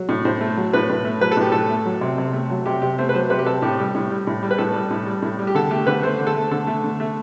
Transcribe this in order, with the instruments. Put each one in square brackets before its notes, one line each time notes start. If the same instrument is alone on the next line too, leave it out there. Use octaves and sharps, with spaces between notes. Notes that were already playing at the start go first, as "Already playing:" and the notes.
Already playing: [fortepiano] F#3
A2
A2 C5
A3
F#3
A2 B4
A2
A3
F#3 B4
A4
A2 G4
A2 A4
A3
F#3
C3
C3
A3
F#3
C3 G4
C3 G4
A3 C5
B4
F#3 C5
C3 B4
G4
C3 A4
A2 G4
G3
A2
G3
A2
G3
B4
A2 A4
G3
A2
G3
A2
G3
G4
D3 A4
A3 G4
D3 B4
A3 C5
D3
A4
A3
D3 A4
A3
D3
A3